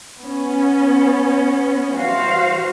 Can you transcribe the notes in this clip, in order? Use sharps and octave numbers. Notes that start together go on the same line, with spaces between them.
B3 C#4
E3 G3 F#4 C5 F5